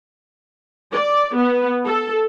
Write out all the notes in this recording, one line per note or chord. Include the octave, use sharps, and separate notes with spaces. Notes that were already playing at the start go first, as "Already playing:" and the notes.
D5
B3
A4